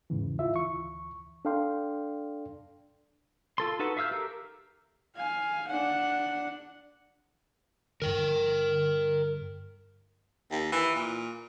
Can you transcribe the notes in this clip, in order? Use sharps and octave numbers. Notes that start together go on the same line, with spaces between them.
E2 G#2 C#3 E3
E4 F4 E5
D2 E3 C#6
D4 A4 D5 F5 G5 C6
F4 A4 C6
D#4 F#4 A4 B4 F#5
E5 F5 E6 F6 G6
G4 A4 A#4 A#5
F5 G#5
D4 F#5
G2 D3 A#4 G5
D#2
E3
A#2